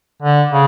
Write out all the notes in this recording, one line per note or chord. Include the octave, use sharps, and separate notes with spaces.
D3
C#3